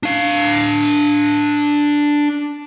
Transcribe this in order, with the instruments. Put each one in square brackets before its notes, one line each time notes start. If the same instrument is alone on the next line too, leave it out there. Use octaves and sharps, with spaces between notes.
[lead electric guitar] D4 F5